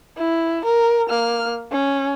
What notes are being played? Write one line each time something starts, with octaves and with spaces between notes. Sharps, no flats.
E4
A#4
A#3 F6
C#4